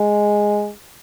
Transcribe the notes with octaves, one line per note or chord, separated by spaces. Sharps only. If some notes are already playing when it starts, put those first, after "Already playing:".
Already playing: G#3